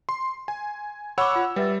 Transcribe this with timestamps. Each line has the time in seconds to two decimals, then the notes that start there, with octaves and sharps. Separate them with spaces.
0.09 C6
0.48 G#5
1.18 C#5 F#5 B5 C#6 D6 E6
1.31 F4 B5
1.56 G3 B4 E5 A6